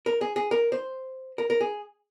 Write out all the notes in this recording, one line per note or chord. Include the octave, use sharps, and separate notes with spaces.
A#4
G#4
G#4
A#4
C5
A#4
A#4
G#4